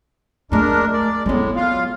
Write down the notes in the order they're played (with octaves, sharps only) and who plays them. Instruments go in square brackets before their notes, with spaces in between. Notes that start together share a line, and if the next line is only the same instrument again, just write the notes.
[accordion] G#3 D4 A#4 [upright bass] A3 F4
[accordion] D5
[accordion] A2 G#3 [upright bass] F#3 B3
[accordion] F4 F5